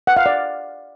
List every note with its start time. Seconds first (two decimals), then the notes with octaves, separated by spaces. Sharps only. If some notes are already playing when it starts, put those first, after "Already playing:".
0.07 F#5
0.17 F5
0.26 D5